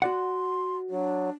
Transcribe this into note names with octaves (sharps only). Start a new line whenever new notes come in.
F#4 D5 F#5 C6
F#3 D4